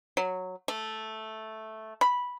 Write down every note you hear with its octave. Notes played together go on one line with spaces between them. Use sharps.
F#3
A3
B5